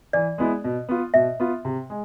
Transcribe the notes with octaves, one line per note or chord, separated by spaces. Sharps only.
E3 D5
G#3 B3 E4
B2
B3 F4
B2 E5
B3 F4
C3
G#3